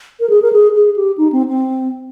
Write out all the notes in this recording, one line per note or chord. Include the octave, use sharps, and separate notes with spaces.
A#4
G#4
A#4
G#4
G#4
G4
D#4
C4
C4